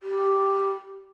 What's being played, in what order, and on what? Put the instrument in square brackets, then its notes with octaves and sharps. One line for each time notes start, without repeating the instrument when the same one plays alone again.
[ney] G4